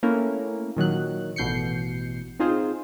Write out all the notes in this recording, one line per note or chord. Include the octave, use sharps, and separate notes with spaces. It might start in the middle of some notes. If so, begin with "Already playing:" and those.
A3 A#3 C#4 E4 A#4
A#2 D#3 F#3 F#6
A1 B2 G6 C7 C#7
C4 D#4 F4 G#4 C5